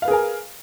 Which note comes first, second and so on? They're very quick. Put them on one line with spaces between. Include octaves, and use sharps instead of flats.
F5 B4 G#4 A#4 G#5